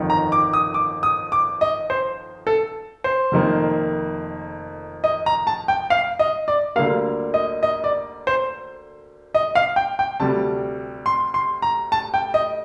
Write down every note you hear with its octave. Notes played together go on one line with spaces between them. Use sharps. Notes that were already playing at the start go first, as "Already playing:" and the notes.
Already playing: G1 F2 D#3
A#5
D6
D#6
D6
D#6
D6
D#5
C5
A4
C5
F1 F2 D#3 A#3
D#5
A#5
A5
G5
F5
D#5
D5
D2 D3 G3 A#3 F5
D#5
D#5
D5
C5
D#5
F5
G5
G5
D2 C3 G3 A5
C6
C6
A#5
A5
G5
D#5